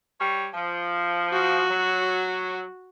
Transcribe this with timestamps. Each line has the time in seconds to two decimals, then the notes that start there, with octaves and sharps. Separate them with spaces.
0.19 G3 C#5
0.53 F3
1.33 F#4
1.69 F#3